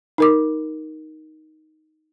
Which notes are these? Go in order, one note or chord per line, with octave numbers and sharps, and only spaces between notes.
D#4 A#4 D6